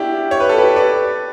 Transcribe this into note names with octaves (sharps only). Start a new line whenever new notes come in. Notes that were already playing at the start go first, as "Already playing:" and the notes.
Already playing: D4 E4 F#4 G4
C#5
B4
A4
G4 B4
B4 D5